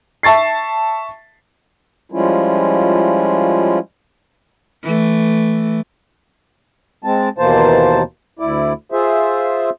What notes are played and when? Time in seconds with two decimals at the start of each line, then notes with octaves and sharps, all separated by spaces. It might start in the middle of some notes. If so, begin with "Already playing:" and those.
0.23 E5 A5 C#6 A6 C7
2.12 F3 G3 G#3 C#4 E4 F4
4.83 E3 A3
7.04 G#3 C4 A5
7.38 D#2 B2 E3 A#3 C5 A5
8.39 D2 E4 D5
8.92 F4 G#4 C5 E5